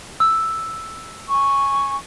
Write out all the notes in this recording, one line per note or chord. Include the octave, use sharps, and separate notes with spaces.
E6
G#5 C#6